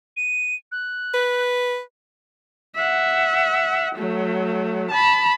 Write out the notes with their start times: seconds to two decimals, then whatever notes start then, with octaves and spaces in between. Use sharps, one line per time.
0.17 D#7
0.72 F#6
1.14 B4
2.76 E5 F#5
3.95 F#3 A3
4.90 A5 B5